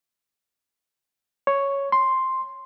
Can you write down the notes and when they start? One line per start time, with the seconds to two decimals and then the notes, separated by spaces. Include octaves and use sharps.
1.47 C#5
1.92 C6